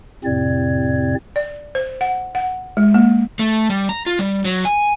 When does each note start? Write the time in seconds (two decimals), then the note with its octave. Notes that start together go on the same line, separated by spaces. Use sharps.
0.24 F2 A2 C3 C4 D5 G#6
1.36 D5
1.75 C5
2.01 F#5
2.35 F#5
2.77 G#3
2.94 A#3
3.39 A3
3.70 G3
3.89 A#5
4.06 F4
4.19 G3
4.44 F#3
4.65 G#5